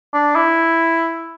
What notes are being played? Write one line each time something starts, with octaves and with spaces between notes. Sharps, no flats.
D4
E4